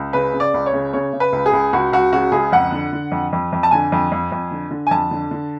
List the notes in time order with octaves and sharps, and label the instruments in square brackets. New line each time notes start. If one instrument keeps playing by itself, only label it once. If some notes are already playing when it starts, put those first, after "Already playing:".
Already playing: [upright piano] C#2
C#3 B4
C#3
D5
C#2
C#5
C#3
C#3 C#5
C#3
B4
C#2
G#4
C#2
C#2 F#4
C#2 F#4
C#3 F#4
C#2 G#4
F2 F#5
D3
D3
F2
F2
F2
A5
D3 G#5
F2
F2
F2
D3
D3
G#5
F2 A5
D3
D3